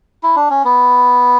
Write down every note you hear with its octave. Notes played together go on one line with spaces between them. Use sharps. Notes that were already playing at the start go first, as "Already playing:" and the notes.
E4
D4
C#4
B3